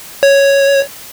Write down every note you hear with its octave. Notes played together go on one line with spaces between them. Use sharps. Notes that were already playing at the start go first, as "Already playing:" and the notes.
C#5